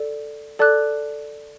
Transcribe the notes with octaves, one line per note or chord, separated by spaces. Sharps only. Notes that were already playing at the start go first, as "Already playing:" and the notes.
Already playing: A4 D5
A4 D5 A5 D6 F#6